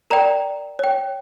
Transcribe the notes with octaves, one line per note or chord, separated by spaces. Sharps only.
A#4 D5 G5 A#5
C#5 G5